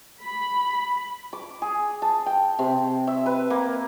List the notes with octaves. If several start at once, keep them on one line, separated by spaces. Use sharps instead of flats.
B5
D6
G#4
A5
G5
C3
E5
B4
A#3